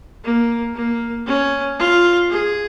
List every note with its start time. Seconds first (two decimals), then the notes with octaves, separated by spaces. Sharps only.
0.24 A#3
0.75 A#3
1.26 C#4
1.79 F4
2.30 G#4